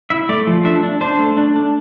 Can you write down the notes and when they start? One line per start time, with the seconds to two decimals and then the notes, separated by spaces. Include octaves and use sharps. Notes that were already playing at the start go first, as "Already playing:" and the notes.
0.10 E4 E5
0.29 A3 D5
0.47 F3
0.65 D4 E5
0.83 D4
1.01 D4 C5
1.19 A3
1.37 D4
1.56 D4